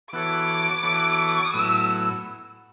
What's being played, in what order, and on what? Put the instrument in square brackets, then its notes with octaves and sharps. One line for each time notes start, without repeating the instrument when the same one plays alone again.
[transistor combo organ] E3 B3 F#4 A4 C#5 [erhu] D6
[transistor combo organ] E3 B3 F#4 A4 C#5
[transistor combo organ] A2 F#3 B3 E4 [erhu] E6